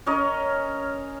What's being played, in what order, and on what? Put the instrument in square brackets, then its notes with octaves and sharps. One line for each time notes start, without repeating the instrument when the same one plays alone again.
[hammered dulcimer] C#4 A#4 C#5 D#5